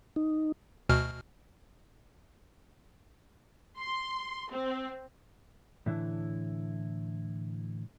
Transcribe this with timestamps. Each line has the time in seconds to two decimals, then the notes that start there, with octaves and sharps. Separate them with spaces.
0.16 D#4
0.89 D2 B2 F6
3.78 C6
4.51 C4
5.86 A2 D3 E3 E4